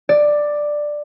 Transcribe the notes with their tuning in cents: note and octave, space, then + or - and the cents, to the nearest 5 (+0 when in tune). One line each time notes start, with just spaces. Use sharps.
D5 +10